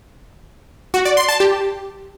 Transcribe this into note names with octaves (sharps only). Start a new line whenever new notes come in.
F#4
D5
C6
A5
G4